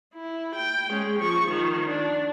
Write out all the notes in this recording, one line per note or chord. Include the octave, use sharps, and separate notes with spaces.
E4
G5
G#3 C#4
F3 C#6
D#3 F3
D4